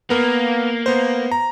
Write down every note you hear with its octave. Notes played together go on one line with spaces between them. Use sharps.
A#3 B3 A#4
B3 C5
A#5